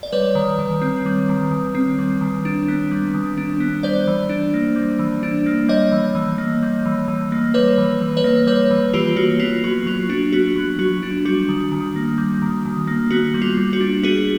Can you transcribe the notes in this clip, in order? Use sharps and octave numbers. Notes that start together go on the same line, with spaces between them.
D5
G3 B4 C#5
D#3
D#3
C4
G3
D#3
D#3
C4
G3
D#3
D4
B3
G3
D#3
D4
B3
G3 C5 D5
E3
D4
A#3
G3
E3
D4
A#3
G3 C#5 D#5
E3
E3
A#3
G3
E3
E3
A#3
G3 B4 C#5
E3
E3
B4 C#5
A#3
G3 B4 C#5
E3
E3 F4 G4
A#3 F#4
B3 F4
F#3 F#4
F#3 F4
D4 F#4
B3 F#4
F#3
F#3 F#4
D4
G3 F#4
D#3
D#3
A#3
G3
D#3
D#3
A#3
B3 F#4
G3
F4
G3
F#4
D4
B3 F#4 G#4